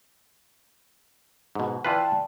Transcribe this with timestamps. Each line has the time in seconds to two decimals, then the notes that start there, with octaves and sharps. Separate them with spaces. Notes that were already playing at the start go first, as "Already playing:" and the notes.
1.55 G#2 B2
1.85 E3 F4 B4 D5 G5 A5